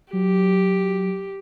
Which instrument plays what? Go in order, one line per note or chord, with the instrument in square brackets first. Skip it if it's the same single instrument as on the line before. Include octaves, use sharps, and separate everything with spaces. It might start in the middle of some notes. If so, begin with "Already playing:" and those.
[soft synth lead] F#3 [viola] G4